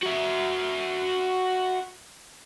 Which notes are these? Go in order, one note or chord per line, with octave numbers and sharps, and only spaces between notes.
F#4 E5